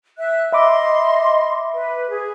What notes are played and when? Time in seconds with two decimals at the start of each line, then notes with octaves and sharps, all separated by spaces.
0.18 E5 F#6
0.52 D#5 E5 B5 C6 D6
1.74 B4
2.11 G#4